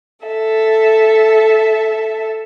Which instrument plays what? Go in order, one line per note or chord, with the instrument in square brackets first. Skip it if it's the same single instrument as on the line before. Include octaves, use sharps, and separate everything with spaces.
[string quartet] A4 E5